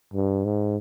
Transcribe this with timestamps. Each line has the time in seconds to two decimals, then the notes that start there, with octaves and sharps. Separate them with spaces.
0.14 G2
0.45 G#2